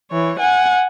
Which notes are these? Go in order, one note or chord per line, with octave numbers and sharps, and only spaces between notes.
E3 C#5
F#5 G#5